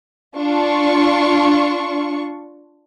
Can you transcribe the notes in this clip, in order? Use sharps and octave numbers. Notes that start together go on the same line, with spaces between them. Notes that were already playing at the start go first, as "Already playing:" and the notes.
D4 F4 C#6